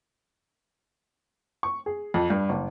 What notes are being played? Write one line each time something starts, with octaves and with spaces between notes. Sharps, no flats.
C#6
G#4
F2
G2
F#1